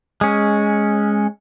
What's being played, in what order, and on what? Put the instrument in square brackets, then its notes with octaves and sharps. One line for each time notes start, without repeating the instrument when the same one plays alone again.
[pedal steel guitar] G#3 C#4